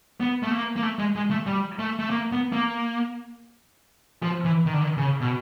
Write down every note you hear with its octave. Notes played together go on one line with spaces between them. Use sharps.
B3
A3
A#3
A#3
A3
G#3
G#3
A3
G3
A3
A3
A#3
B3
A#3
F3
E3
D#3
D3
D#3
C#3
B2